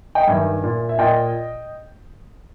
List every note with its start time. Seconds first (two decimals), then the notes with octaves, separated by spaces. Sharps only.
0.15 D#5 G5
0.27 G2 D#3 E5 G#5
0.63 A#2
0.89 E5
0.99 A#2 D#5 G5